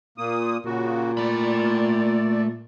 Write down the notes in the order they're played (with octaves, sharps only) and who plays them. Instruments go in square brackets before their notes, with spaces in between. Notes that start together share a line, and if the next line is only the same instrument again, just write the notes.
[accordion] A#2 A#3 D#6
[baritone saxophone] A#2 [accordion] C#3 F#4
[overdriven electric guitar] A3 B5 [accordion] D5